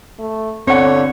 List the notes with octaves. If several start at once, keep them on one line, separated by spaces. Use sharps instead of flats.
A3
G1 D3 C4 C#5 F#5